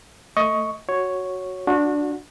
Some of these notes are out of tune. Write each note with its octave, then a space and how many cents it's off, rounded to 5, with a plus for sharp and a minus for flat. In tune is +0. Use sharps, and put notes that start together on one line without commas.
A3 +20 D#5 +20 C#6 +0
F#4 +0 C#5 +0
D4 +0 F#4 -25